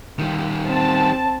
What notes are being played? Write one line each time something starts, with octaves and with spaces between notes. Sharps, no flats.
D#3 G3
C4 A5